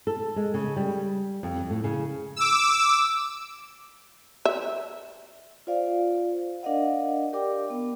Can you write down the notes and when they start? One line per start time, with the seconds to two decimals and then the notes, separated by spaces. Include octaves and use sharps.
0.07 A4
0.36 G#3
0.54 C#3
0.76 G3
1.43 F2
1.70 A2
1.84 C#3
2.36 D6 E6
4.45 E5
5.67 F4 C5 D5 F5
6.63 D4 A#4 D5 D#5 F5 F#5
7.33 G4 A#4 D5 G5 D6
7.70 B3